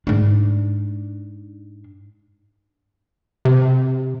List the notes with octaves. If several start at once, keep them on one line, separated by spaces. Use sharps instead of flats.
G#2 D4
C3